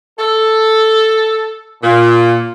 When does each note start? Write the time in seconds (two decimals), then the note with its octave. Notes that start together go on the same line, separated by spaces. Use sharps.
0.19 A4
1.82 A#2